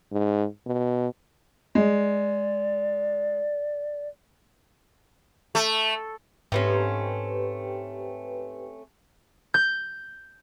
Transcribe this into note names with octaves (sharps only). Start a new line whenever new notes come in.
G#2
B2
G#3 D5
A3
G#2 A3 C4 C#4 G4 B4 G5
G6